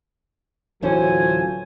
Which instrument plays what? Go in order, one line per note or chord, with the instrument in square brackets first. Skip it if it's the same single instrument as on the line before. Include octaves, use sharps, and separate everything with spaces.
[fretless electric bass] D1 E3 C#4 [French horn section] F#3 F4 [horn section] A4 C5 G#5